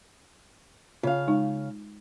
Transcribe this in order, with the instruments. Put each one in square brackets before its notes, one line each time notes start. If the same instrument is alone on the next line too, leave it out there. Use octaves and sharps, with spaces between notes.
[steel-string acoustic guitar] C#3 F5 [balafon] F4
[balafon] G#3 D#4